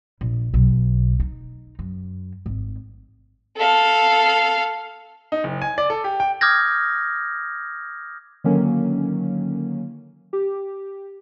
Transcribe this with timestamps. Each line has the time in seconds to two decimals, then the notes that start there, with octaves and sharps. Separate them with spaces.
0.21 A#1
0.54 B1
1.20 D#4
1.79 F#2
2.46 G#1
3.57 A4 F5
5.32 D#4
5.44 F#1
5.62 G#5
5.78 D5
5.90 A4
6.04 G4
6.20 G5
6.41 D6 D#6 F6 G6 G#6 A#6
8.44 D3 D#3 F#3 A#3 C#4
10.33 G4